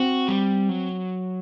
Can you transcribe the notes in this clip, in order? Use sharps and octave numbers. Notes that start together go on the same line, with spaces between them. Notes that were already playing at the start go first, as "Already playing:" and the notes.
Already playing: C4 F#4
G3
F#3